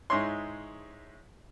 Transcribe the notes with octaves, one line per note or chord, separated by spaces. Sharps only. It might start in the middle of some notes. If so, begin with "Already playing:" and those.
G#2 G#3 E4 C#5 C6